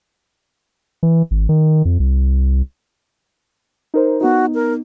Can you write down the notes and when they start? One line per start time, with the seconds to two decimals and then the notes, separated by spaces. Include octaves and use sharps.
1.03 E3
1.31 G#1
1.49 D#3
1.85 F2
2.00 C2
3.94 D#4 A#4 C5
4.21 B3 D#4 F#4
4.54 A#4